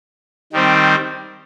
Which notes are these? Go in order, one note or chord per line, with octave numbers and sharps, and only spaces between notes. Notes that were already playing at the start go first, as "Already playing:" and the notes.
D#3 G3 C4